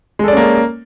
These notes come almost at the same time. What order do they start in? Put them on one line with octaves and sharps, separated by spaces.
G#3 A4 D5 C#4 A#3